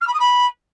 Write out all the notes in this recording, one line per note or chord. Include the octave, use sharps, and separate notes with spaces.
F6
B5
D#6
B5